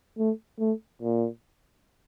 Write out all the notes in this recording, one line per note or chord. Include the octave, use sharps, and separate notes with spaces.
A3
A3
A#2